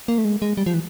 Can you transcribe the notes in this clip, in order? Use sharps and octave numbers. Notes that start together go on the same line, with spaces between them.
A#3
A3
G#3
G#3
G3
F3
E3